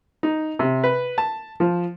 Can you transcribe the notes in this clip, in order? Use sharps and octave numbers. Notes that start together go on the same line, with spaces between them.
D#4
C3
B4
A5
F3